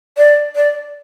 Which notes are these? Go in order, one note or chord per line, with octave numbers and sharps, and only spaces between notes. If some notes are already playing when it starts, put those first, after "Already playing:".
D5
D5